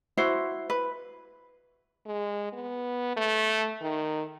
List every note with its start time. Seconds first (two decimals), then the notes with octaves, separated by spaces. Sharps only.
0.17 E4 F#4 C5
0.70 B4
2.06 G#3
2.53 B3
3.17 A3
3.81 D#3